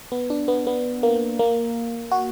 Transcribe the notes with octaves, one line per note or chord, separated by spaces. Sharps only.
B3
D4
B3
B3
A#3
A#3
F#4